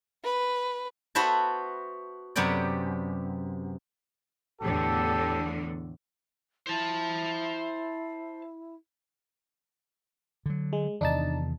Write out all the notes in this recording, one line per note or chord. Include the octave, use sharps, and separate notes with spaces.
B4
B3 F#4 B4 C5 E5 A5
F#2 C3 B3 G4 D5
E2 A2 D3 G4 A4
E4 C5 A5
D3 F#3
G#3
E2 C3 D#3 D4 D#4 A5